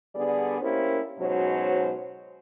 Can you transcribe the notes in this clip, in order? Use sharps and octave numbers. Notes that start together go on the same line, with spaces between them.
D3 G3 B3 G#4 D5
A#3 C#4 E4 G4 A#4 C5
G#2 B2 F#3 C#4 C5 C#5